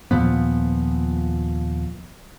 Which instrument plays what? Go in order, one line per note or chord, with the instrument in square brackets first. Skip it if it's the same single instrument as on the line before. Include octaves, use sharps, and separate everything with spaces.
[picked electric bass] D#2 A#2 F3 B3